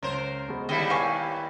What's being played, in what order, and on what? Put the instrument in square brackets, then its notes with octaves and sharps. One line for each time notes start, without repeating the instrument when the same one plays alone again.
[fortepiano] C#2 [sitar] A#4 C5
[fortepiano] B2 G#3
[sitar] D#2 G3 E4 [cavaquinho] D#5
[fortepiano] B4 [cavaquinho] F5 G#5 C#6